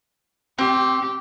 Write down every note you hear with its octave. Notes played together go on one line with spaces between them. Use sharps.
C4 G4